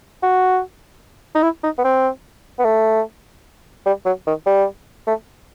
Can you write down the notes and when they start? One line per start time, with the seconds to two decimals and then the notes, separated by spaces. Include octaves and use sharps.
0.23 F#4
1.35 D#4
1.43 E4
1.63 D#4
1.78 B3
1.84 C4
2.59 B3
2.65 A3
3.86 G3
4.06 F#3
4.27 D#3
4.46 G3
5.07 A3